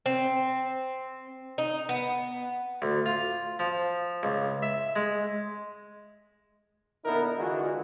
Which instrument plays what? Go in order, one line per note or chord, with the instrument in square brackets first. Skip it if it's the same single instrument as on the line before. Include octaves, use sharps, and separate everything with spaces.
[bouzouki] C4
D#4
B3
[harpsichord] D2
F4
F3
C#2
E5
G#3
[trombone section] A#2 D3 B3 D#4 E4 A#4
D3 E3 G#3 F4 F#4